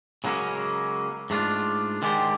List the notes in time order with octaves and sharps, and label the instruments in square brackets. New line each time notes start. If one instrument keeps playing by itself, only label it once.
[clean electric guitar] C#3 F#3 G#3 A#3 C#4
G#2 A3 D4 F4
D3 D#3 G#3 D4 G4 C5